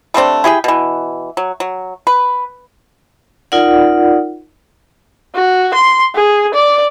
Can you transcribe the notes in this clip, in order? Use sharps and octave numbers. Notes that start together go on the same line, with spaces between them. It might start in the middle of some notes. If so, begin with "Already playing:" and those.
G3 A3 C4 D4
E4 G4 G#4 G5
B2 E3
F#3
F#3
B4
D#4 F4 A#4 D5 F#5
F#4
C6
G#4
D5